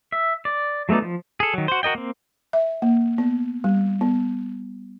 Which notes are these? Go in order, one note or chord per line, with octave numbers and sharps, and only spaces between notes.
E5
D5
F#3 A3 B3 D#4 D5
F3
G#4 A4
D#3 F#3
F#4 C5
F#4 A#4 D#5 G5
A#3 C4
E5
A#3
B3
G3
B3